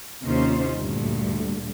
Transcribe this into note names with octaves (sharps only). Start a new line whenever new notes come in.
D#2 C3 C#4 D#4 F4 C5
D2 G2 A#2